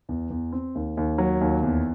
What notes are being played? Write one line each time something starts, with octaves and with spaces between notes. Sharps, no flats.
E2
E2
C4
D#2
D#2
F#3
D#2
E2